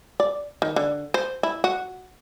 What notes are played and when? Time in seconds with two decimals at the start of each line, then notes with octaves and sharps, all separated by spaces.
0.20 D5
0.62 D#3
0.76 D3
1.14 C5
1.43 E4
1.64 F#4